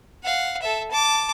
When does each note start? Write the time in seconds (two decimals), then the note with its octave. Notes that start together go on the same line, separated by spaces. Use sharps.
0.23 F5 F#5
0.62 A4 E5
0.91 A5 D6